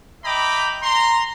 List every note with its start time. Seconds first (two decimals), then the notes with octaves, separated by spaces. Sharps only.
0.24 D#5 E5 G5 A#5 B5 D6
0.82 A#5 C6